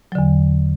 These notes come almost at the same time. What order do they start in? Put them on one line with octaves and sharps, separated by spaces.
F#3 D3 E2